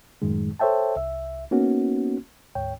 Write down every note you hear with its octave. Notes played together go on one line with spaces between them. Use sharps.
F#2 A2 D#3 G#3
A4 C5 C#5 E5 G5 A5
C2 E5
A#3 B3 C#4 D#4 F#4
D2 G#2 C#5 G5